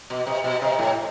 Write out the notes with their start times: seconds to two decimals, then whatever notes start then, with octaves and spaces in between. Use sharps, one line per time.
0.10 B2
0.27 C3
0.44 B2
0.62 C3
0.79 A2